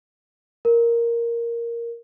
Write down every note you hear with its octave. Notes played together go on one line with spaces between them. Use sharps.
A#4